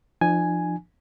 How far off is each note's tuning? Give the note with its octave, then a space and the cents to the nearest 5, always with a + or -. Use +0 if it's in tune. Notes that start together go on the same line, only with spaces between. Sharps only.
F3 -15 D4 +45 G#5 +0